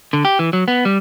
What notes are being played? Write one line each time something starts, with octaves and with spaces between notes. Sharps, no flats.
D3
G4
E3
F#3
B3
G3